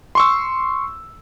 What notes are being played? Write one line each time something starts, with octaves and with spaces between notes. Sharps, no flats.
C6 C#6 E6